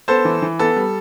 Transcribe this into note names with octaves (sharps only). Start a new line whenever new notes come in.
B3 A4 C5
E3
E3
B3 A4
G3